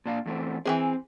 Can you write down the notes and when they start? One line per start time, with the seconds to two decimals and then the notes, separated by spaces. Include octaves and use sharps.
0.06 A#2 D4 F5
0.26 E2 A3 C4
0.66 E3 G#3 C4 G#4